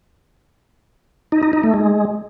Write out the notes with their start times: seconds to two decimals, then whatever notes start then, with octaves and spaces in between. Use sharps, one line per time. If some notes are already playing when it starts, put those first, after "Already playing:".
1.32 D#4
1.43 D#4
1.53 D#4
1.63 A3
1.74 G#3